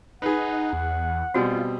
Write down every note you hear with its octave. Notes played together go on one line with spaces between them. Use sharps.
D#4 G#4 B4 F#5
E2
B2 G3 C4 F4 F#4 G#5